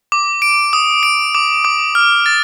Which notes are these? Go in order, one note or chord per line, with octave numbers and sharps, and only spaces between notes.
D6
D7
D#6
D7
D6
D6
F6
A6